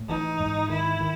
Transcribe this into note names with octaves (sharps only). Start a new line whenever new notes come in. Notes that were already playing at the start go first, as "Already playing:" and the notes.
Already playing: A2
E3 D#4
G#2
D#3 E4
D#3